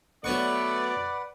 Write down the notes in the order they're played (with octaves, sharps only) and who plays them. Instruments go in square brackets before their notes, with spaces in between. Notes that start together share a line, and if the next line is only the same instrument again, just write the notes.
[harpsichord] F#3 B3 C#6 [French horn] A3 [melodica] B4 F#5 [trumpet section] D5